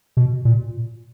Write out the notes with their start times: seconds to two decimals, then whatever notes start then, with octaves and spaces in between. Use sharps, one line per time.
0.17 B2
0.45 A#2